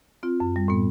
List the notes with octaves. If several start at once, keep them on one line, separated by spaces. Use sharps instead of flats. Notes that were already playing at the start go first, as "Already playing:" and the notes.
C4 F4
F#2
G3
A2 B3